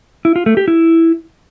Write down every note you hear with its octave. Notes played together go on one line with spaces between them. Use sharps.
E4
F4
A3
G4
E4